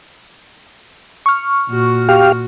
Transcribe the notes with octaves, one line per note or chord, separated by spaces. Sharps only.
C#6 F6
A#2 F#4
G4 F5